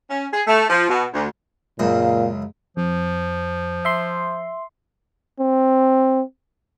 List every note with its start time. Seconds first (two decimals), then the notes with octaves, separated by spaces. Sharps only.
0.09 C#4
0.31 G#4
0.47 A3
0.69 F3
0.89 B2
1.12 D2
1.79 C#2 F#2 A#2 F5
2.77 F2 F3
3.85 E5 C6
5.40 C4